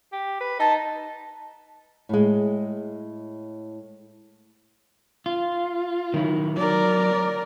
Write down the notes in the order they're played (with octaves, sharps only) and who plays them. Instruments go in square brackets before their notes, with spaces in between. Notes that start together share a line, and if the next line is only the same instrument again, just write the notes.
[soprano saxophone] G4
B4
[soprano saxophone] D#4 [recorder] A5
[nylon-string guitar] A2 G#3
[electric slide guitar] F4
D#3 F#3 E4
[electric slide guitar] F#3 [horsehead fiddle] A#4 D5